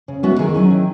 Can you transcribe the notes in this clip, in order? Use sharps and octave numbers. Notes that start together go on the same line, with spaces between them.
C#3
G#3 B3 E4 F#4
D#3 G#4
F#3 C#4 E4
D#3